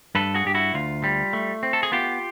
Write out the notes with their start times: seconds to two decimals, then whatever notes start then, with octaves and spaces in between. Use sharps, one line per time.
0.15 G2 A4 B4
0.34 F#4 G#4
0.45 G2 G4
0.54 E4 F#4
0.74 D2 F4
1.04 G3
1.33 A3
1.63 C4
1.73 A4
1.83 G#4
1.92 B3 F4 G4